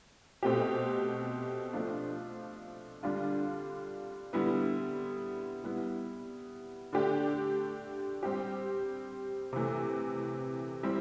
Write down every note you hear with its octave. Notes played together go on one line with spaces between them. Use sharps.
B2 A3 C4 G4
F3 A3 D4 F4
D3 G3 D4 F4
D3 G3 B3 E4
G3 B3 E4
D3 A3 D4 G4
G3 C4 G4
C3 E3 A3
G3 C4 E4